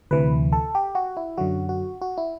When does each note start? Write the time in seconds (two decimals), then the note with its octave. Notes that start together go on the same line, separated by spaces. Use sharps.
0.11 D2 C3 E3 B4
0.52 A4
0.75 G4
0.95 F#4
1.17 E4
1.38 F#2 D3 F#3 F#4
1.69 F#4
2.02 F#4
2.17 E4